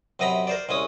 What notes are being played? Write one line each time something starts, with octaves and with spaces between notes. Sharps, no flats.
F#2 C3 D#5 A#5 B5
A#4 C5 D5
C2 G#3 C#4 D#6